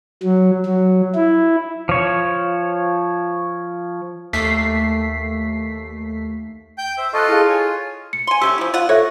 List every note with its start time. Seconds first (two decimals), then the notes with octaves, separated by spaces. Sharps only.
0.23 F#3
0.66 F#3
1.15 E4
1.89 F3 C#5
4.33 D#2 A3 B6 C7
6.78 G5 G6
6.98 C5 E5
7.14 F4 A4 D#5 C#6 F#6
7.28 E4 G#4 F5
7.49 C#5 G#5
8.13 C#7
8.27 G#5 C6
8.41 A3 C#4 G4 E6
8.58 F3 E4
8.74 F4 F#5
8.89 A4 C#5 E5 F#6